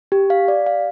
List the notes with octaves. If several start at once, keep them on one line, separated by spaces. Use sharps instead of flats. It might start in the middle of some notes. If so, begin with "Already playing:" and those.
G4
F5
D5
F5